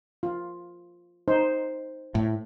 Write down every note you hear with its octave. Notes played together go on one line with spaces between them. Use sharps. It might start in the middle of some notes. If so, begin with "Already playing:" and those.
F4
D#4 C5
A2